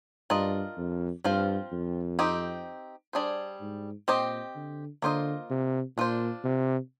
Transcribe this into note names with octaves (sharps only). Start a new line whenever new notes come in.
G2 D4 F4 A#4 D#5
F2
G2 F3 C4 F4 C5 F5
F2
C4 D#4 G4
G3 D4 G#4 C5
G#2
A#2 C4 G4 C5 D#5
D3
D3 A#3 F4 C5 D#5
C3
A#2 D4 F4 C5
C3